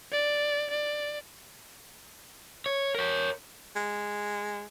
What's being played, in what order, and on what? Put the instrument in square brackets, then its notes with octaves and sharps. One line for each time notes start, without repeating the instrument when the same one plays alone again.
[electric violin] D5
D5
[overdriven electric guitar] C#5
A#4 C#5
[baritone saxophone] G#3